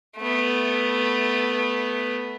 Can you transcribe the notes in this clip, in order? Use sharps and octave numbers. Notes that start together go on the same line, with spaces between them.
A3 B3